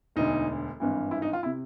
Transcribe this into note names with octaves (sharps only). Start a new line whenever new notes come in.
E1 D2 D3 D#4
G#1 G2 E3
E4
D#4
F4
C3 E4